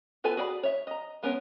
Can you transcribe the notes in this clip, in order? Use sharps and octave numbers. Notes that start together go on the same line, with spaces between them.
B3 F4 A4 B4 G#5
F#4 G#4 D5 G5 B5
C#5 E5
D#5 A#5
G#3 B3 C#4 A#4 C#5